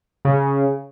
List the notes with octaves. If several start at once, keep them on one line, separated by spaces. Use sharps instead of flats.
C#3